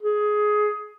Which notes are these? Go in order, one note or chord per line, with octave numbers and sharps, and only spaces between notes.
G#4